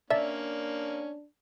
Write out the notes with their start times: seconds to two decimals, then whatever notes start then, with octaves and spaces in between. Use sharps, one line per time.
0.10 A#3 C#4 D4 D5 E5 A5